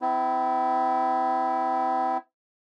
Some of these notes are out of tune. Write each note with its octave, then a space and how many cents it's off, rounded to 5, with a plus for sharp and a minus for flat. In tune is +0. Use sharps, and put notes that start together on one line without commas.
C4 -35 E4 +0